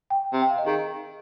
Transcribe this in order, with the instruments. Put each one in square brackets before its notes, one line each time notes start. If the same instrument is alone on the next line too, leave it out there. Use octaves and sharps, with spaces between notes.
[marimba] G5
[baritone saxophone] C3
[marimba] G5
F5
D#5
[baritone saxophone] D#3 [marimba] G#4